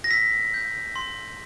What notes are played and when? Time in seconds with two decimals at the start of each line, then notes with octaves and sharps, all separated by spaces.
0.04 A#6
0.11 E6 B6
0.54 G6
0.96 C6